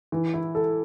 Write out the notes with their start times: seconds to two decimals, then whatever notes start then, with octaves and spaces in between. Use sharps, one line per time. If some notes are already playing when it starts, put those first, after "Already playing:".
0.12 E3
0.34 E4
0.55 A4